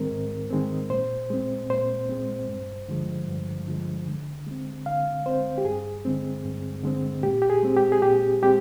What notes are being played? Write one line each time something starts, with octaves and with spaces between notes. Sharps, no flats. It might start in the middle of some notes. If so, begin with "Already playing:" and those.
Already playing: G#2 D#3 G#3 C4 A#4
G#2
D#3 G#3 C4
A#2 C5
G#3 C4
A#2 C5
G#3 C4
G2
D3 F3 G#3
G2
D3 F3 G#3
D3
G#3 C4
D3 F5
G#3 C4 C5
G4
G2 G#4
D3 G#3 C4
G2
D3 G#3 C4
A#2 G4
G4
G#4
G#3 C4
G4
G#4
A#2 G4
G#3 C4 G4